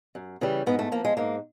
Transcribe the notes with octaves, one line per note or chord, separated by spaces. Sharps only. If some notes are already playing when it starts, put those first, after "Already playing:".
F#2
C#3 E3 G3
G#2 B3
A3
F3 A#3
G#3
G#2 A#3